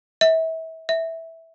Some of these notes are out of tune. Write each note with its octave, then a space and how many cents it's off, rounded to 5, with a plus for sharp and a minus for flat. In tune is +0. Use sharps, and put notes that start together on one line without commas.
E5 -30
E5 -10